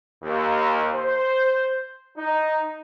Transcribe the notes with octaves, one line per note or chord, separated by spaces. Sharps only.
D#2
C5
D#4